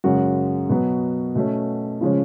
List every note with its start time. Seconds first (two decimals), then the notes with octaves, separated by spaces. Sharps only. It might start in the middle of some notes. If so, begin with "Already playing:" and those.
0.04 F#2 C#3 G#3 C#4 F#4
0.69 B2 F#3 B3
1.35 B2 A3 C#4
2.01 C#3 F3 G#3 C#4